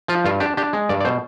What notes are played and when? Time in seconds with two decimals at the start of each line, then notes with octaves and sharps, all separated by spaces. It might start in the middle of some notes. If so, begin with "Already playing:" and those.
0.08 F3 F4
0.25 G2 F4
0.40 D4 G4
0.57 D4 G4
0.73 G#3
0.89 G2 D5
1.00 D5
1.05 B2 C5